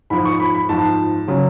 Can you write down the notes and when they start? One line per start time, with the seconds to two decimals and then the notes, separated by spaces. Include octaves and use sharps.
0.10 G#2 F3 B5
0.25 C#6
0.40 B5
0.55 B5
0.69 G#2 F3 A5
1.28 C#3 F#3